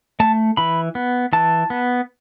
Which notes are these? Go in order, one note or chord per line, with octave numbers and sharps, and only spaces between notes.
A3 A5
E3 B5
B3
E3 A5
B3